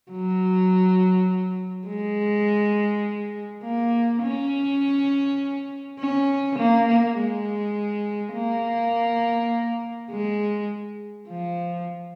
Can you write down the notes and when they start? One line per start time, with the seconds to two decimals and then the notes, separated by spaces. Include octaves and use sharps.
0.11 F#3
1.88 G#3
3.64 A#3
4.22 C#4
6.00 C#4
6.59 A#3
6.88 A#3
7.17 G#3
8.34 A#3
10.11 G#3
11.29 F3